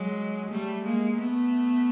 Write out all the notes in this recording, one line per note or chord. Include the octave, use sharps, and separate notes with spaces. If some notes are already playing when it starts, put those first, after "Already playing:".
Already playing: F#3 G#3
G3 A3
G#3 A#3
A3 B3